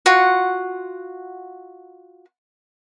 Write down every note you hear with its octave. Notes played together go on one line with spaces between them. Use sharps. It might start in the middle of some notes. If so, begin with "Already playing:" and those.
F4 F#4 F#5